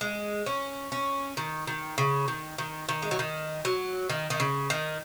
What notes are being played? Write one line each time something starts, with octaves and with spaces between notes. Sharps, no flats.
G#3
C#4
C#4
D#3
D#3
C#3
D#3
D#3
D#3
G#3
F#3
D#3
F#3
D#3
D#3
C#3
D#3